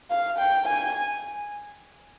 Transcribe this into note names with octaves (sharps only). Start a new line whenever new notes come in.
F5
G5
G#5